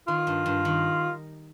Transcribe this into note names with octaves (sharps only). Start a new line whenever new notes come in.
D#3 F4
G2
G2
D#3